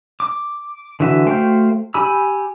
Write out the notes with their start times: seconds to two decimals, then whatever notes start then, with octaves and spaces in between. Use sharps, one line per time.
0.20 D6
1.00 D3 E3 F#4 E5
1.26 A3 F#4 C5 F5 G5
1.94 G4 G#5 B5 E6